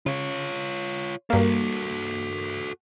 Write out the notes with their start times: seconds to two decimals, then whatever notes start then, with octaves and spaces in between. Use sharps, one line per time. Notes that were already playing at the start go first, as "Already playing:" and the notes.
0.06 C#3 F4 C#5
1.30 G2 A#3 F#4 A4